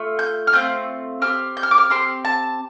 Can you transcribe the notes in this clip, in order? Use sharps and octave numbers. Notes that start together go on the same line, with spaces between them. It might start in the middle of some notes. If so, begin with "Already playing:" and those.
Already playing: A3 F4
G6
F6
A3 C4 F4 G6
C4 G4 F6
G6
F6
D6
F6
C4 G4 C6
A5